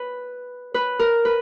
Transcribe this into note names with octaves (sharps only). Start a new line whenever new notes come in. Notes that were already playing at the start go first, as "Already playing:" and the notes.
Already playing: B4
B4
A#4
B4